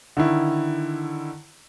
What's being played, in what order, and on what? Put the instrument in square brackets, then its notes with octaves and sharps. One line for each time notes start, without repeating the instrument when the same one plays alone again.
[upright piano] D3 D#3 E4